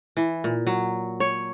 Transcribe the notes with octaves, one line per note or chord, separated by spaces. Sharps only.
E3
A#2
F#3
C#5